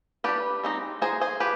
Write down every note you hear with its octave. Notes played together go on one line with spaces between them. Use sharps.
G3 D4 G4 B4
G#3 C4 D#4
G#3 C4 D#4 G#4 C5
G#4 C5
F3 G4 B4